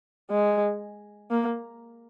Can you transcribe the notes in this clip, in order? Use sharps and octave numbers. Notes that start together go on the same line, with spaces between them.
G#3
A#3